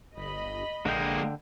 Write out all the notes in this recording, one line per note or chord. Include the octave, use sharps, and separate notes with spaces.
G1 D#5 B5
A#1 D3 G#3 A#3 G5